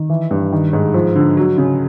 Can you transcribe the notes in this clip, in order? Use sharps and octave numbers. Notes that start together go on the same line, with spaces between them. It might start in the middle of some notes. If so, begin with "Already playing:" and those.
Already playing: D#3
E3
G2
D#3
G#2
F3
D3
F#3
C#3